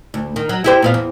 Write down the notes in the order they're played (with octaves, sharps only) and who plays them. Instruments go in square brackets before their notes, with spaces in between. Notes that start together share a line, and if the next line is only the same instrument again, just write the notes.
[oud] D2
D#3
F#3
E4 G4 C5
A#2 B3 F5
E2